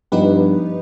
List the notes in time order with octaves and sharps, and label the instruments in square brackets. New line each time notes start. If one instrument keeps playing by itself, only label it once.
[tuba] G2 [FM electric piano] F3 B3 D#4 G4 B4